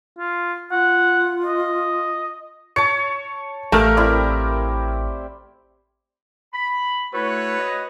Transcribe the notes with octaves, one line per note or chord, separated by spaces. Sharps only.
F4
F4 F#5
D#5
C#5 A5 C#7
A1 A3 G4 A#4 F5 C#6 F6
C4 E4 D5
B5
A3 E4 F#4 A4 B4 C#5
D#5